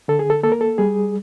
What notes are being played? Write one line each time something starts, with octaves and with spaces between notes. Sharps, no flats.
D3 A4
G#4
A4
A#3 A4
A#4
A4
G3 G#4